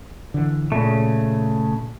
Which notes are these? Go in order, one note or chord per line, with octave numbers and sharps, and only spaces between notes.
D3 E3
A#2 C#3 A3